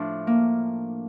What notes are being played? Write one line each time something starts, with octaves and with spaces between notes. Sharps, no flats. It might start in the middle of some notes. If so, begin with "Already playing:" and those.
Already playing: A2 F3 D4
A#3